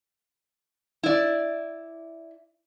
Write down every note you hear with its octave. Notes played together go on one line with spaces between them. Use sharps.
E4 D5